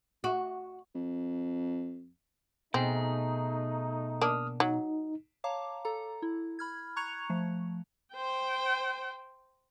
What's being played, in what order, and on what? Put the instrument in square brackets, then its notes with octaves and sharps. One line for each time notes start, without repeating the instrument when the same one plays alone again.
[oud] F#4
[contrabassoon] F2
[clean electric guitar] B2 G#4 [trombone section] A3 D#4 [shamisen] C4
[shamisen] A#3 D4 [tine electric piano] D#6 F6
[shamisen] F#3 [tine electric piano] D#4
[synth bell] C#5 F5 A5 A#5 D6
A4 A#5
E4
B5 F6 G#6
A#5 C#6 F#6 G#6 C#7 F7
F3 A3
[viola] C5 G5